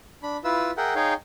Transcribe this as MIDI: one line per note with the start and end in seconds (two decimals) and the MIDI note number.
0.23 0.37 62
0.23 0.37 83
0.44 0.71 64
0.44 0.71 65
0.44 0.71 71
0.44 0.71 88
0.77 0.94 68
0.77 0.94 70
0.77 0.94 76
0.77 0.94 78
0.77 0.94 79
0.95 1.14 63
0.95 1.14 68
0.95 1.14 73
0.95 1.14 77
0.95 1.14 79